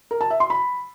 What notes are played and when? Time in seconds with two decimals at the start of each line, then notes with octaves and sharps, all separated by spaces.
0.11 A#4
0.21 A5
0.30 E5
0.40 C6
0.50 B5